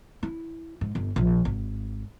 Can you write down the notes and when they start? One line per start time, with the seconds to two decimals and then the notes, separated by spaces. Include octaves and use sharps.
0.23 E4
0.81 G#2
0.95 G1
1.16 A#1
1.45 G#1